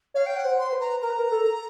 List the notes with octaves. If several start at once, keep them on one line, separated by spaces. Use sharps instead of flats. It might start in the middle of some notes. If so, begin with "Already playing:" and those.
C#5 F5
G5
F#5
C5
C6
C5
B4
A#5
A#4 A#5
B4
A#4
A4